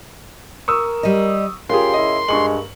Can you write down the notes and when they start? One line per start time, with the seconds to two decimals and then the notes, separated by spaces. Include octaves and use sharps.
0.68 A#4 C#6 D#6 E6
1.03 G3 D#5
1.70 C#3 F4 G4 G#4 A#4 C6
1.94 E4 D#5
2.28 G2 G#3 C#6 F#7